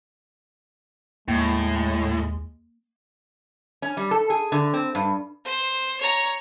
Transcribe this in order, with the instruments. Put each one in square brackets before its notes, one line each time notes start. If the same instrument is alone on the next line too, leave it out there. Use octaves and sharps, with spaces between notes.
[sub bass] D#2 [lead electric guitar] A2 [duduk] G#3 [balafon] A#3
[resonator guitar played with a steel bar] C#4
G3
A4
G#4
D3
C4
G2
[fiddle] C5
C#5 A#5